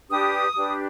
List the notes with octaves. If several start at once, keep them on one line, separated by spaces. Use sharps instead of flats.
D4 G4 B4 D#6
D4 G4 B4